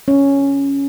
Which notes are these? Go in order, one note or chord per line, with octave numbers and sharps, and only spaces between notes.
C#4